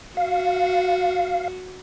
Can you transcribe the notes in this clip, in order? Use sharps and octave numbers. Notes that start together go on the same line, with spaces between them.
F#4 F5